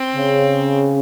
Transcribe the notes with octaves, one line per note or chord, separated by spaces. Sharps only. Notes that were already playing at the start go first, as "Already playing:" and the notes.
Already playing: C4
C#3